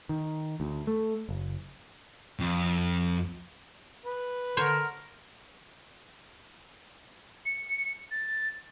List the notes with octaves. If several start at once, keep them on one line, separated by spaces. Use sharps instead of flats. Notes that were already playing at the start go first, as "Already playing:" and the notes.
D#3
D2
A3
F#1
F2
B4
D3 A#4 C5 C#5
C#7
A6